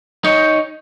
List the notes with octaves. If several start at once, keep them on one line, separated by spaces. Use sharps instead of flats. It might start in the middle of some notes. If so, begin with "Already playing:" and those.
D#4 C#5